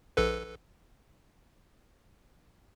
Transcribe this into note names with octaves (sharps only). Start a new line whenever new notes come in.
A#1 A4 B4